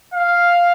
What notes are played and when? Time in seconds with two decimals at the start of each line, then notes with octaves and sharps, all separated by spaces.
0.14 F5